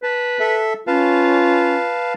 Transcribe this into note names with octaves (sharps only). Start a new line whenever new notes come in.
B4 A5
A4 E5
C#4 F4 B4 F5 A5